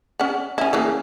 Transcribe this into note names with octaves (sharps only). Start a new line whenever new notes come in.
C#4 F#5
C#4 E4
C#3 E3 A#3